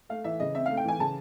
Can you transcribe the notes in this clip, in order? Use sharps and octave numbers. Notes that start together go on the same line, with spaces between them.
A3 F5
E3 E5
C#3 D#5
C4 E5
A3 F5
G5
E3 G#5
C#3 A5